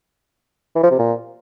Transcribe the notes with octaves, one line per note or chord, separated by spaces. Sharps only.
E3
F3
C3
A#2